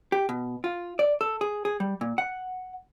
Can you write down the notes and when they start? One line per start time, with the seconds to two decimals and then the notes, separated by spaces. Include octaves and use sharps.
0.12 G4
0.29 B2
0.64 F4
0.99 D5
1.21 A4
1.41 G#4
1.65 G#4
1.80 G3
2.01 A#2
2.18 F#5